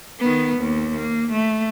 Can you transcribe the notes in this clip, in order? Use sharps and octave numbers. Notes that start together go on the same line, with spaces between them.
D#3 B3
D#2
A#3
A3